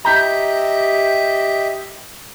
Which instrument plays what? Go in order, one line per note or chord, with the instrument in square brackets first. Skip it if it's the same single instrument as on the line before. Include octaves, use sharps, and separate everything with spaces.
[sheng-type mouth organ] G4 D#5 E5 [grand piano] A#5 G6 B6